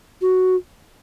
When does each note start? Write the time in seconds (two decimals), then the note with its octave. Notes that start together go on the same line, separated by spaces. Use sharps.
0.21 F#4